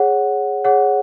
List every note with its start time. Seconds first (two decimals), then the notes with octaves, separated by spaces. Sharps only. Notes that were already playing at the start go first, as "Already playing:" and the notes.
Already playing: G#4 C#5 F#5
0.64 G#4 C#5 F#5